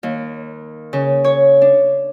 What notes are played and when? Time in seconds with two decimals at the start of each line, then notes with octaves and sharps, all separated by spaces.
0.03 D#2
0.93 C#3
1.24 C#5
1.61 D4